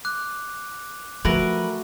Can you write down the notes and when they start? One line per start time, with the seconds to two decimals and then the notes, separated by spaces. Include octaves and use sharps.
0.05 D6 F#6
1.25 F3 A3 F#4 A#4 B4